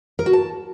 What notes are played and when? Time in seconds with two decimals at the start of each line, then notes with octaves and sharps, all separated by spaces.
0.19 A#4
0.26 F#4
0.33 A5